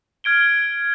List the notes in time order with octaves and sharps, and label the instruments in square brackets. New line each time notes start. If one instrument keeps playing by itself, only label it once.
[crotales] F6 G#6 D7 G7